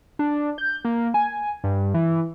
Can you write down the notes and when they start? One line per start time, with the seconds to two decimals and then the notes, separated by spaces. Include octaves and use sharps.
0.19 D4
0.58 G6
0.85 A#3
1.14 G#5
1.64 G2
1.94 E3